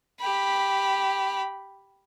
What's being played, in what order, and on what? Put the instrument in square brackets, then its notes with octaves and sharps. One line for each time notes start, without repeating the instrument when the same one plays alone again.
[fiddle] G4 B5